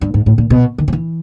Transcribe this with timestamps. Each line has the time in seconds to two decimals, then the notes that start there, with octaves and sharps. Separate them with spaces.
0.01 G2
0.14 G#2
0.26 A2
0.38 A#2
0.50 B2
0.78 D#3
0.88 F3
0.93 E3